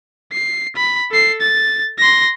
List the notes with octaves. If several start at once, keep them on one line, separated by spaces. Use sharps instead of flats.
C7
B5
A4 C7
A6
C6 A#6